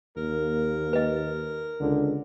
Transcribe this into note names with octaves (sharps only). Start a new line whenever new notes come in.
D#2 A#3 A#4
B4 D#5
C#2 D3